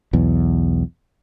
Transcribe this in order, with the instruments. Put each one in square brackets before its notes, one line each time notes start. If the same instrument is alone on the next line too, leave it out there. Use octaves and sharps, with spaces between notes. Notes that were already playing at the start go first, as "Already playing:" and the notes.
[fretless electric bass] B1 E2